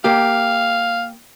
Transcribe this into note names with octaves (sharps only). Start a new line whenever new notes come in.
A#3 G4 F5